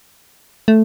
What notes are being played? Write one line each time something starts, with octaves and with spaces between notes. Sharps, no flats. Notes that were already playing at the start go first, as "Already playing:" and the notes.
A3